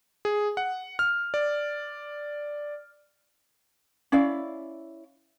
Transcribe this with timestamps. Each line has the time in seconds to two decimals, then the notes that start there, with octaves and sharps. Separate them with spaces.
0.25 G#4
0.57 F#5
0.99 F6
1.34 D5
4.12 C#4 E4 D5 F5